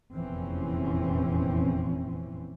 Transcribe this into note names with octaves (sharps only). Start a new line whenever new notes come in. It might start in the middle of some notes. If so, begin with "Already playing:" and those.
F1 E2 A#2 E3 C4 C#4